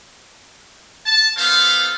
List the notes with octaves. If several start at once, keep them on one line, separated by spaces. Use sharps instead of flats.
A5
B3 D#4 A4 C5 F5